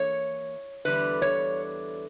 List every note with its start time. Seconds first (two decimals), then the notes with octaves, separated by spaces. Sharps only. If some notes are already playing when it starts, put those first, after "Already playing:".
Already playing: E3 A#3 C#5
0.85 E2 D3 G3 B4
1.22 C#5